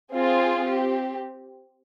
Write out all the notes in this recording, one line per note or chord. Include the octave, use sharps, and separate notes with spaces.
C4 F4 G#4
C4 G4